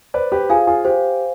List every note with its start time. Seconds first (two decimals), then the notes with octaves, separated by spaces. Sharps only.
0.14 B4 C5 D5
0.32 G4 B4
0.50 F4 G#4 F5 G#5
0.67 F4 G#4
0.85 G4 C5